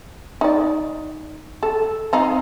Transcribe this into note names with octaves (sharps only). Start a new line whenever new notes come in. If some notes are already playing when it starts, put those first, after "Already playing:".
D#4 D5
A4
C4 D#4 F5